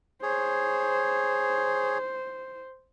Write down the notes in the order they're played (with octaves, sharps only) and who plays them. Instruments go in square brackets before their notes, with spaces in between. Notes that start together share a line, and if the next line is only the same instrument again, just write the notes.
[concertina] G#4 C#5 [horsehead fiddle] C5